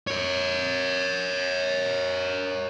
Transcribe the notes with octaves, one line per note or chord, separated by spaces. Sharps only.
A#4 C#5